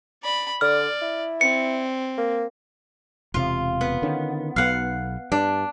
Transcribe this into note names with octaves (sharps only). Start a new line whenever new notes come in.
D5 B5
D3 D5 F6
E4
C4 C#7
A#3
E1 C3 F4
B3
D3 D#3 C#4
B1 B3 F5 F#5
G2 D4